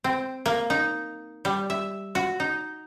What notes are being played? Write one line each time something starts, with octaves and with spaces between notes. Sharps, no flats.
C4
A#3
D#4
G3
E5
F#4
D#4